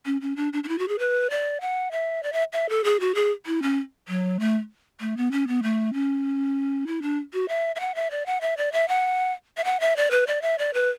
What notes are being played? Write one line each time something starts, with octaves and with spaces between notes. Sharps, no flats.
C#4
C#4
D4
D4
D4
E4
F#4
G#4
B4
D5
F#5
E5
D5
E5
E5
A4
G#4
F#4
G#4
E4
C#4
F#3
A3
A3
B3
C#4
B3
A3
C#4
E4
D4
F#4
E5
E5
F#5
E5
D5
F#5
E5
D5
E5
F#5
E5
F#5
E5
D5
B4
D5
E5
D5
B4